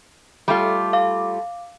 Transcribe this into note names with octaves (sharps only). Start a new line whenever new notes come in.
G3 A3 F4
F5 D6